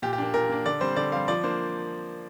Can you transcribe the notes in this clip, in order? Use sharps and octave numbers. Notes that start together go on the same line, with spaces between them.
A#2 G4
G4
A#3 D4
A#2 A#4
A#3 D4
D3 D5
G3 C4 C5
D3 D5
G3 C4 F5
F3 D5
A#3 D4 C5